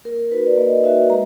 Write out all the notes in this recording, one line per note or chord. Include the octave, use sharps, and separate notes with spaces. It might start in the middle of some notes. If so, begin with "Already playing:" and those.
A#3 A#4
D#4 F#4 B4
D5
A#3 D#5
D#4 F#4 E5
G#3 A#5